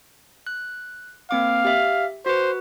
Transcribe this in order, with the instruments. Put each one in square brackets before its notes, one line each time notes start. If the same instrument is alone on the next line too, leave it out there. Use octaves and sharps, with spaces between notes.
[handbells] F#6
[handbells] A#3 C4 D6 [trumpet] F5
[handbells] G4 E5
[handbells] F#4 B4 [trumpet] C5